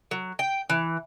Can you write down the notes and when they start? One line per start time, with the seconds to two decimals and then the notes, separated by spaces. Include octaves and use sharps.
0.11 F#3
0.39 G5
0.70 E3